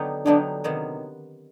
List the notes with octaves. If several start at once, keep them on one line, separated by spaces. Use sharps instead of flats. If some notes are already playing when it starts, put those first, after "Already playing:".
Already playing: D3 F#3 B3 D#4 G4
D3 F#3 B3 D4 D#4 G4
C3 D#3 F#3 B3 D#4